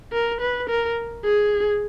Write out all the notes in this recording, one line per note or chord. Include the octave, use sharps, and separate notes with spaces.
A#4
B4
A#4
G#4